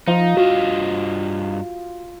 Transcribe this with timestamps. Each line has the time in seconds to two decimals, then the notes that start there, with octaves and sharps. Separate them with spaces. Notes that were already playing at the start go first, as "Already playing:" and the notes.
0.07 F3 D#4 F4
0.37 G2 F#4 D#5 F5